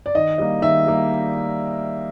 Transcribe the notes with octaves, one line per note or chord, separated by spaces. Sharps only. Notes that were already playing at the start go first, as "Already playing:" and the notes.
D5
D#3 D#5
G3 A#3 D#5
D#3 E5
G3 A#3